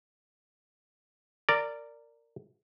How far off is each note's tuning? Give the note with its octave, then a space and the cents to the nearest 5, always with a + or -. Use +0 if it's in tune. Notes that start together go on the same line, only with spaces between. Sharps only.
A#4 -15 D5 +0